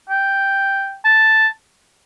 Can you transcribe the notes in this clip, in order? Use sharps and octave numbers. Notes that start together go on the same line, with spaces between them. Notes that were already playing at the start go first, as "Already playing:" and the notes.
G5
A5